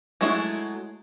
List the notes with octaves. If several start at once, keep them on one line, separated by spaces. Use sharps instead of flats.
F#3 G#3 A3 E4